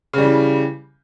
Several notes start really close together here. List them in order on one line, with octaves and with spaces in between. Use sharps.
C#3 G3 E3